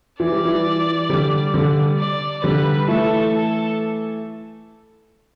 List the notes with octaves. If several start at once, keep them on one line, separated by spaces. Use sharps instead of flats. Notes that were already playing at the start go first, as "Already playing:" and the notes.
E3 D5
G3
E3
D3 G3
D3 G3
D5
D3 G3 B4
E3 A3 A4
A4